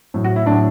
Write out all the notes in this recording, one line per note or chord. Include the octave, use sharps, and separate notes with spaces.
A2 F#3
F#4
E4
A2 F#3 D4